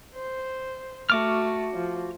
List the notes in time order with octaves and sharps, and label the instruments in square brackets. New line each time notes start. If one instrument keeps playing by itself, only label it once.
[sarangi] C5
[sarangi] A3 [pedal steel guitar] F#4 D6 F6
[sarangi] F3